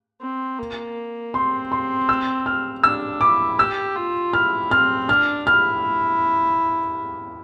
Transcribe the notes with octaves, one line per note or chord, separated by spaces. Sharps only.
C4
A#3
C4 C6
C6
E6
F6
D4 E6
E4 D6
G4 E6
F4
E4 F6
C4 F6
D4 F6
E4 F6